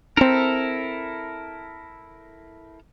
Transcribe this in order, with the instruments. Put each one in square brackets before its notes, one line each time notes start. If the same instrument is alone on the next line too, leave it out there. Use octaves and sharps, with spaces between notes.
[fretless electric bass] C4 D4 [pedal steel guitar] E4 A4 A#4